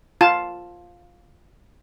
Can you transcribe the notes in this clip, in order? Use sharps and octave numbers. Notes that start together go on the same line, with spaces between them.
F4 A5